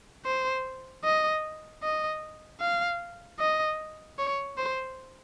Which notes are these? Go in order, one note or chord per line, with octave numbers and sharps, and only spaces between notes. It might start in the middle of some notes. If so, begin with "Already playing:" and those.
C5
D#5
D#5
F5
D#5
C#5
C5